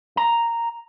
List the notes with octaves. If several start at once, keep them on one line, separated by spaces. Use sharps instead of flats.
A#5